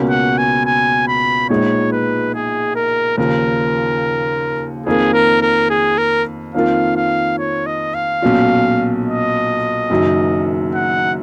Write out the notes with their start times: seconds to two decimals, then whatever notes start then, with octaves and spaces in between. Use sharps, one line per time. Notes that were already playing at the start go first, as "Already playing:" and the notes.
Already playing: C#2 B2 A#3 C#4 F#4
0.09 F#5
0.38 G#5
0.66 G#5
1.08 B5
1.50 A#1 A#2 G#3 D#4 C#5
1.92 B4
2.34 G#4
2.76 A#4
3.18 D#2 C#3 F3 A#4
4.86 F2 D#3 A#3 G#4
5.14 A#4
5.42 A#4
5.70 G#4
5.98 A#4
6.55 F2 D#3 A#3 F4 F5
6.96 F5
7.39 C#5
7.66 D#5
7.95 F5
8.22 B1 A#2 F#3 C#4 F4
9.06 D#5
9.90 F#1 F#2 D#3 F#3
10.75 F#5